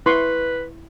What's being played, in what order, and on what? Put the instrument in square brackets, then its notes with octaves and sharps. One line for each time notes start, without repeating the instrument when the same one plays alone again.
[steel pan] E4 C6 C#6 [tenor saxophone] B4